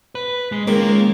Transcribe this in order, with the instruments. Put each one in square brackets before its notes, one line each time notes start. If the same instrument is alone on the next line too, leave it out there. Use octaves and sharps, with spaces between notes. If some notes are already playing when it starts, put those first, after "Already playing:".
[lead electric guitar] B4
G#3
[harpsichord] C#2 D#3 [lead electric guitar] A#3